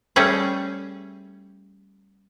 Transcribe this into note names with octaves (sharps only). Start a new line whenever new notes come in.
G3 A3 C#4 G#4